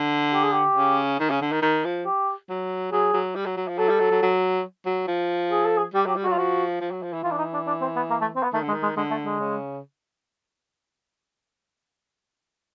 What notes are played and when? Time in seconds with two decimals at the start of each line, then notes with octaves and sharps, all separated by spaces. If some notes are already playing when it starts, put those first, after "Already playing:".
Already playing: D3
0.33 G4
0.43 G#4
0.52 G4
0.76 C#3
1.20 D#3
1.30 C#3
1.41 D3
1.52 D#3
1.62 D#3
1.85 F3
2.06 G4
2.50 F#3
2.92 F#3 G#4
3.13 F#3
3.35 G3
3.46 F#3
3.57 F#3
3.68 F3
3.78 F#3 A4
3.89 G3
4.00 F#3
4.11 F#3
4.22 F#3
4.86 F#3
5.08 F3
5.51 G#4
5.65 A4
5.77 G#4
5.94 G3 G4
6.06 F#3 G4
6.16 G3
6.24 F#4
6.27 F#3 F4
6.37 F3 F#4
6.81 F3
6.91 F#3
7.03 F3
7.13 E3
7.23 E3 F4
7.32 D4
7.38 D#4
7.53 D4
7.67 D4
7.81 C4
7.96 B3
8.10 A#3
8.21 A3
8.36 C4
8.43 B3
8.53 D#3 A3
8.63 D3
8.68 G#3
8.73 D#3
8.83 G#3
8.97 D3 G#3
9.11 A3
9.25 G#3
9.40 C#3